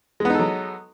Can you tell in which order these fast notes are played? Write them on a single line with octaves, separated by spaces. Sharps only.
G#3 B3 D#4 A4 F#3